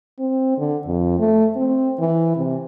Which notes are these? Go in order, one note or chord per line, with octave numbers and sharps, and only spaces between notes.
C4
D3
F2
A3
C4
E3
C3